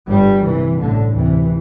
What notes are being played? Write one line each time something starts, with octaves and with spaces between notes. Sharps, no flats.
G1 G2 G3
C2 C3 E3
A1 A2 D3
D2 C3 E3